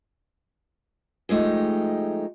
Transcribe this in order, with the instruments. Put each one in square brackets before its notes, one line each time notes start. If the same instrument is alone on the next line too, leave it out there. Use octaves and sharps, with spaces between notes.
[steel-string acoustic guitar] F3 G#3 A3 D#4 G4